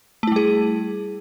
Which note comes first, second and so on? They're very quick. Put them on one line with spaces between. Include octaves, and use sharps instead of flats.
A3 E4 G3 G#4